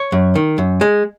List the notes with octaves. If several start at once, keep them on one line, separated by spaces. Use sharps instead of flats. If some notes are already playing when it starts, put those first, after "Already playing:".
Already playing: C#5
F#2
D#3
F#2
G#3